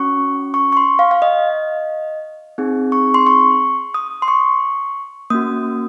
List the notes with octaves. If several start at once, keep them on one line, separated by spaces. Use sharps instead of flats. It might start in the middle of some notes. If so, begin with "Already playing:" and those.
Already playing: C#4 F#4 C#6
C#6
C#6
C6
F5
F5
D#5
C4 D#4 G#4
C#6
C6
C#6
D#6
C6
C#6
A#3 C#4 F#4 D#6